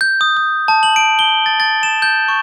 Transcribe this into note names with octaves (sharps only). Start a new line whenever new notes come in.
G6
D#6
D#6
A5
F#7
D7
G7
A6
A6
E7
G6
C#6